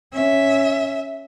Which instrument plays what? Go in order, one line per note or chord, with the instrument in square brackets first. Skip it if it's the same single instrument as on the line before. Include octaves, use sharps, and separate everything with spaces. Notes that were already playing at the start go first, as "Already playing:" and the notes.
[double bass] C#4 [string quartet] E5